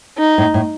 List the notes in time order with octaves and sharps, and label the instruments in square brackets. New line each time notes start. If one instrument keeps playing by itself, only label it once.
[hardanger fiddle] D#4
[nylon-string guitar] A2
A2